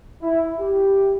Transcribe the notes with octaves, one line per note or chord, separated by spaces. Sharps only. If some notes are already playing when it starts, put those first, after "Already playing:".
E4
G4